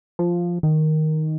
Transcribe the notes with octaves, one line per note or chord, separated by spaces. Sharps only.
F3
D#3